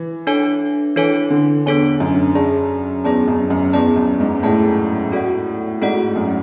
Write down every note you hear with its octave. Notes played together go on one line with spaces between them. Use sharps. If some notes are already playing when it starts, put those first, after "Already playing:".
Already playing: E3
D4 A4 C#5 G#5
E3 D4 A4 C#5 G#5
D3
E2 D4 A4 C#5 G#5
F#2
G#4 D5 A5
E2 G#4 D5 A5
F#2
F#2
E2 G#4 D5 A5
F#2
G#2
A2 G#4 D5 A5
F#4 A4 D5 F#5
G#2 F#4 A4 D5 F#5
F#2